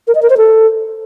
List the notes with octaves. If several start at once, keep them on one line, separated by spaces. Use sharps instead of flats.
A#4
D#5
A#4
C5
A4